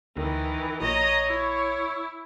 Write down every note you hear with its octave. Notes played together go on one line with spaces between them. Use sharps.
D2 D#3 E3
A#1 C#5 D#5 A#5
E4